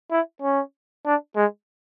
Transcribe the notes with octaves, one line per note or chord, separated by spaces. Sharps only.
E4
C#4
D4
G#3